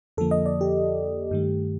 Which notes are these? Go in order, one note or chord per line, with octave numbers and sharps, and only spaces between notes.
F2 D3 F3 A#3 A4
D#5
D5
G4
G2 D#3 A3